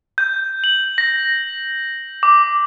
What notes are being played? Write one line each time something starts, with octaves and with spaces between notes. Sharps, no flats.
G6
F#7
A#6
D6